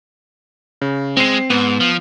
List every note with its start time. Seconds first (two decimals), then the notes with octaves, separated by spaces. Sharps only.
0.82 C#3
1.17 G#3 C4 C7
1.50 G#2 B3
1.80 F3